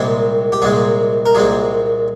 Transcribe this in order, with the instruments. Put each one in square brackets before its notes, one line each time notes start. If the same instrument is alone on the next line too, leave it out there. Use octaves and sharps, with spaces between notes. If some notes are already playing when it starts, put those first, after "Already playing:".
Already playing: [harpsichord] C2 A#2 G#3 C4
G4
C2 A#2 G#3 C4 G#4
A#4
C2 A#2 G#3 C4 G#4